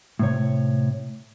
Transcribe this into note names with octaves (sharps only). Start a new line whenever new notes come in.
A2 C3 C#5